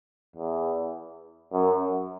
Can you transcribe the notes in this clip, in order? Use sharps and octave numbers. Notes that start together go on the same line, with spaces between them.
E2
F#2